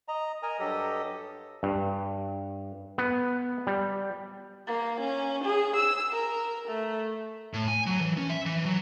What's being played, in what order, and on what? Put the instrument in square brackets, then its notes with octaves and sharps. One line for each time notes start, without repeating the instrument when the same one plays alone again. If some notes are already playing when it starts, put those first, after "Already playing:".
[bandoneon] D#5 A#5
A#4 D#5 G#5 A#5
G2 F#3 G4 A4 D#5 D#6
[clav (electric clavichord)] G2
B3
G3
[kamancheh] A#3
C#4
G#4
E6
A#4
A3
[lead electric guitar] A2
G#5
F#3
E3
C#4
E5
E3
F#3